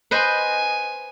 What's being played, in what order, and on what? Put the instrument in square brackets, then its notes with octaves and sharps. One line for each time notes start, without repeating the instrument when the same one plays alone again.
[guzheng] B4 C5 D#5 [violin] G#5